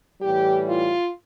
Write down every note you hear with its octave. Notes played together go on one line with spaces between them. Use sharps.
A2 E3 G3 G4
F4